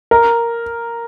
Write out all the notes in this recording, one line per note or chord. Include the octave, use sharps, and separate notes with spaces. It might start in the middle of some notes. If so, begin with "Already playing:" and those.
A#4